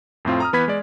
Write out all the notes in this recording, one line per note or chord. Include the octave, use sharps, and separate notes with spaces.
F2 A2 C4 F4
A#5 D#6 F6
E3 B3 B4 B5 G#6 B6
G#3 D5